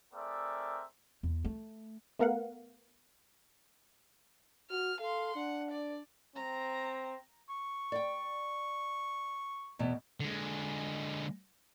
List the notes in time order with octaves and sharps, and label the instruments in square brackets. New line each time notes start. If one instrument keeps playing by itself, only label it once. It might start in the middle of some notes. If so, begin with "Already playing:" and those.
[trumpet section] A3 C4 G#4 A#4 D5 E5
[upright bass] E2
A3
[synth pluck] A3 B3 A#4 F5 F#5
[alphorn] F#4 [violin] F6
[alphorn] A4 [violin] F5 C6
[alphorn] D4 [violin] F#5
[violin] D5
[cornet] C4 [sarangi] A#5
[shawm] C#6
[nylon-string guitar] D5 G5
E2 B2
[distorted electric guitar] D3 G#3